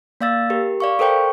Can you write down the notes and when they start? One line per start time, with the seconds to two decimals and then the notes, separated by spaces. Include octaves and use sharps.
0.21 A#3 D5 F5 E6 A6
0.50 G4 A#4
0.80 D5 F5 C#6
0.99 A4 A#4 C5 G5 C#6